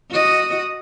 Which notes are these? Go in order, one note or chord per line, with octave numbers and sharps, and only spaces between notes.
F#4 D#5